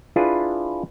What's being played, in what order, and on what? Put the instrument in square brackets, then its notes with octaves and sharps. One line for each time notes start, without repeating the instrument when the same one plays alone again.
[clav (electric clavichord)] D4 E4 F4 G#4 B4